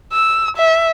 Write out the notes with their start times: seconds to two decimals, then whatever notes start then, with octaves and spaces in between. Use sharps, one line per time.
0.13 E6
0.57 E5